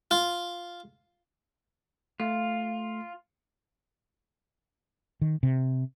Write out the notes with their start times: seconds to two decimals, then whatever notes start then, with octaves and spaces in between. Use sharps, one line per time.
0.11 F4
2.20 A3 F4
5.21 D#3
5.43 C3